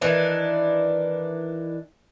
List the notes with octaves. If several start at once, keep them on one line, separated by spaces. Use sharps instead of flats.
D#3 E3 D4